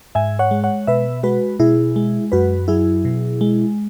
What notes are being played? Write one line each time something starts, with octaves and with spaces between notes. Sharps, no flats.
G#2 E5 G#5
C#5 F#5
G#3
C#5 F#5
B2 B4 E5
G#3 F#4 B4
B2 E4 G#4
G#3
F#2 F#4 B4
F#3 E4 G#4
B2
G#3